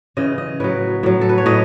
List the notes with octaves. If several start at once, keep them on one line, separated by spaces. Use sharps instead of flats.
C#3 E3 D#5
D#5
A2 F#3 B4
A2 F#3
A4
B4
C#5
A2 D#5